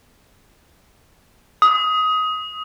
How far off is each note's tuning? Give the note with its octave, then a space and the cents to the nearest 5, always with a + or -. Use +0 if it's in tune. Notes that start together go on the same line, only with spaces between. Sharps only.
D#6 +20